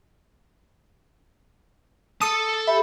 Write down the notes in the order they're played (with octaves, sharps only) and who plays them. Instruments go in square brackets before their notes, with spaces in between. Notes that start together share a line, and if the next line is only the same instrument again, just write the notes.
[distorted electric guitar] A4 A5 [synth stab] D#6
[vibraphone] G4 B5 [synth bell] E5